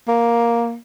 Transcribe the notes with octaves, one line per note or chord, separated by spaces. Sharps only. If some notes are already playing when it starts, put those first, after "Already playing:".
A#3